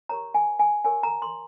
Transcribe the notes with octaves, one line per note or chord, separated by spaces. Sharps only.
G4 A#4 C#5 A#5
G#5
G#5
G4 A#4 C#5 G#5
A#5
C6